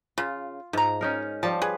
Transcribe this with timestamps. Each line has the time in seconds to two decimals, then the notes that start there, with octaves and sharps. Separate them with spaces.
0.18 C#3 F4
0.73 G#2 F3 A#5
1.01 C#4 D#4 A#4
1.43 F3 G3 A5
1.62 G#4 B4